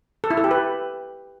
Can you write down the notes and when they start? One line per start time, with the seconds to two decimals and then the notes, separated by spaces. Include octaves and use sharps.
0.24 A4
0.31 E4
0.37 A4
0.44 G4
0.51 B4